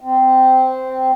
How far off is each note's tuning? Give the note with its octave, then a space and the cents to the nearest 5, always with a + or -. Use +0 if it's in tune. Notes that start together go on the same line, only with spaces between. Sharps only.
C4 -10